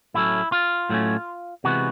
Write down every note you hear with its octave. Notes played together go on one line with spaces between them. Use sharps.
A2 F#3 A3 C#4 E4
F4
A2 F#3 A3 C#4
C3 E3 G#3 B3 F#4